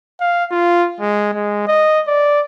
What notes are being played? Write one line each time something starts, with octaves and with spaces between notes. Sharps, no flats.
F5
F4
G#3
G#3
D#5
D5